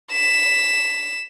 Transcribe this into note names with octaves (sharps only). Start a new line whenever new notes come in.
B6 E7